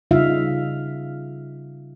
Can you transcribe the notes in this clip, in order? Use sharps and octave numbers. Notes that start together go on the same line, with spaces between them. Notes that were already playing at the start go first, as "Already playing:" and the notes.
C#3 G3 D#4 F4 E5 F5